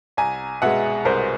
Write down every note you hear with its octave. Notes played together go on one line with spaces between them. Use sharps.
C2 G#5 A#5
B2 G#3 E5 F#5
C2 A#4 C5